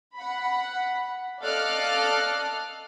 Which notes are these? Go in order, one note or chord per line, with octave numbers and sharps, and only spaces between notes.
F#5 B5
A4 D5 D#5 F5 F6 F#6